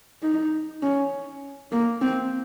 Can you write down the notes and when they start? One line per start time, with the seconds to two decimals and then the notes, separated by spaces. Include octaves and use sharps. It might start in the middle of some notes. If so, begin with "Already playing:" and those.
0.23 D#4
0.83 C#4
1.72 A#3
2.02 C4